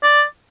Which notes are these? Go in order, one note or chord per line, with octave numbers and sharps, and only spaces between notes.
D5